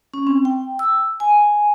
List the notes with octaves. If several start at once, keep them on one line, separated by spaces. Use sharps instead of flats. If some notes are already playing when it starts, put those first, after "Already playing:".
C#4
C4
G5
E6
G#5